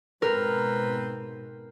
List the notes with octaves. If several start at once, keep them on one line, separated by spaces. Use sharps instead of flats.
G#2 B2 C4 A#4 B4